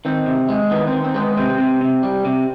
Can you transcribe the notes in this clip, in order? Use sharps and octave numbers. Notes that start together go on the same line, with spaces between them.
D#3 C4
C3
G#3
D#3 B3
C4
D#3
C4
G#3 C4
B3
C3 C4
C3
C3
G3
C3